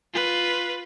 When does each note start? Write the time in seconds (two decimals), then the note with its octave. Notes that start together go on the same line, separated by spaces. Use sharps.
0.13 F4 B4